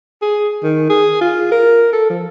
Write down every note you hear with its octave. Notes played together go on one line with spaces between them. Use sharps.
G#4
D#3
G#4
F4
A#4
A4
F3